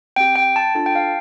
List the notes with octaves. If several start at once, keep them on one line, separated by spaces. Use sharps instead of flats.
C4 G4 G5
G5
A5
D4 F4 A4 A5
G5
F5